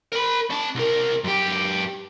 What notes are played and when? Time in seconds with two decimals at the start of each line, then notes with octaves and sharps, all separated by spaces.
0.13 A#4 B5
0.50 C#4 A5
0.75 C2 A#4
1.24 F#2 G4